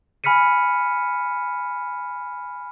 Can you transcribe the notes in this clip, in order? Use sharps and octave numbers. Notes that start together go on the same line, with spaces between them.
G#5 B5 F6 B6 C#7 D#7